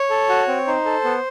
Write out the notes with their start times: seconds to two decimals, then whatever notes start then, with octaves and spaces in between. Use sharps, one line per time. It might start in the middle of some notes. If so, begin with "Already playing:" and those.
Already playing: C#5
0.10 A4
0.29 F#4
0.48 C4
0.67 D#4 C5
0.85 A4
1.04 B3